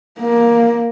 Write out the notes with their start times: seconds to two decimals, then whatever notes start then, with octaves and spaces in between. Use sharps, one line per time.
0.19 A#3